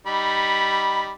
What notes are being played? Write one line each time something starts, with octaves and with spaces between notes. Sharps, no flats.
G3 D#4 B5